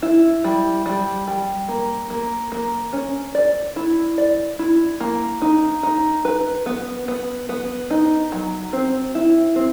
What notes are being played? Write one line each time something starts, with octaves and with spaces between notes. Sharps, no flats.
E4
G3
G3
G3
A#3
A#3
A#3
C#4
D5
E4
D5
E4
A#3
D#4
D#4
B4
B3
B3
B3
D#4
F#3
C4
E4
C4